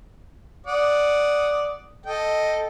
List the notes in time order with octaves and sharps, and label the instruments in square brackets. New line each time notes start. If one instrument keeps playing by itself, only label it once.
[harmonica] D5 F#5 D#6
A4 D#5 G5